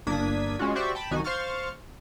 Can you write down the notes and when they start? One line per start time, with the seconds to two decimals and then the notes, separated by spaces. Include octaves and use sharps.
0.07 G1 A#3 D4 D#6 G#6 B6
0.59 G#3 C#4 F4 F#4
0.75 F#4 G4 C5 D5 E5 C#6
0.95 G5 A5 B5
1.11 C2 D#3 D#4 F#4 G#5
1.24 C5 F5 C6 C#6 F6 A6